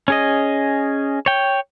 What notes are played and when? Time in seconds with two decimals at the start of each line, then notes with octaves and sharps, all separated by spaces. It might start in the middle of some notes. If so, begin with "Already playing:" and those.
0.08 C#4 G#4 D#5
1.26 C#5 G5